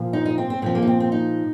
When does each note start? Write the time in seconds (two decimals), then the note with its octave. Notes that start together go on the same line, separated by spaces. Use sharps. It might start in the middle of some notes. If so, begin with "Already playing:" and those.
Already playing: A#2 F3
0.13 D#4
0.26 D#4
0.38 C4
0.50 C4
0.62 A#2 F3 C4
0.75 A#3
0.82 D#4
0.87 C4
1.00 C4
1.12 D#4